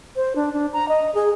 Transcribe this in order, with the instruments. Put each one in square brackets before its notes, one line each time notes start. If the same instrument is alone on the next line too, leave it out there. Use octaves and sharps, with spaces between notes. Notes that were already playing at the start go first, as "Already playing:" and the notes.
[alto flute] C5
D4
D4
A#5
D#5
G#4